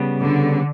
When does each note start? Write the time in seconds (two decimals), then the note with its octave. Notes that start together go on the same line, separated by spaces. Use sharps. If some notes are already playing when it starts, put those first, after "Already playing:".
Already playing: C#3 G3 B3
0.19 D3